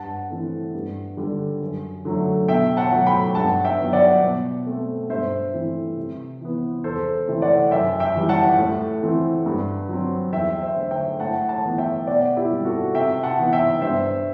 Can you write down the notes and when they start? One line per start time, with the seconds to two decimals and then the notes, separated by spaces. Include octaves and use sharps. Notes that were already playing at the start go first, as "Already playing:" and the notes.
Already playing: G2 F#5 A5
0.30 E3 A3 C4
0.74 G2
1.17 D3 G3
1.61 F#2
2.05 D3 F#3 A3
2.48 B2 E5 G5
2.77 F#5 A5
2.92 F#3 A3
3.06 G5 B5
3.35 G2 F#5 A5
3.64 E5 G5
3.79 F#3 B3
3.93 D5 F#5
4.22 B2
4.67 A3 C4
5.09 G2 C5 E5
5.53 E3 A3 C4
5.97 C3
6.41 E3 B3
6.84 E2 A4 C5
7.27 C3 E3 A3 C4
7.42 D5 F#5
7.71 F#2 E5 G5
8.00 E5 G5
8.15 E3 G3
8.29 F#5 A5
8.58 A2
9.03 E3 A3 C4
9.46 G2
9.89 F#3 C4
10.32 E2 E5 G5
10.62 C5 E5
10.76 D3 A3
10.91 E5 G5
11.20 A2 F#5 A5
11.48 F#5 A5
11.64 E3 B3
11.78 E5 G5
12.07 B2 D5 F#5
12.37 E4 G4
12.50 G3 C4
12.65 F#4 A4
12.95 C3 E5 G5
13.23 F#5 A5
13.38 E3 B3
13.53 E5 G5
13.81 G2 C5 E5